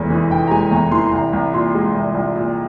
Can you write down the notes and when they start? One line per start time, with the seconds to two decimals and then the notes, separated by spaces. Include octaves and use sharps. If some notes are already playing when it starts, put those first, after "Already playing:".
Already playing: F1 E2 G#3
0.10 E3
0.30 F1 G5
0.47 A#5
0.51 G#3 G#5
0.71 E2 A#5
0.92 E3 C6
1.12 C2 A#5
1.33 C2
1.53 A#2 C6
1.75 G#3
1.95 C2
2.14 C2
2.36 A#2